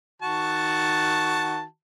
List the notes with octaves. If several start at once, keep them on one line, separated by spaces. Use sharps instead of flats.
D#3 F#4 A5